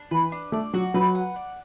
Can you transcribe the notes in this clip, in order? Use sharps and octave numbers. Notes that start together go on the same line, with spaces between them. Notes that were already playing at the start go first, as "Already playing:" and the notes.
Already playing: D4
E3 B4
D4
A3 D5
F#3 F#4
F#3 B4
F#5
D5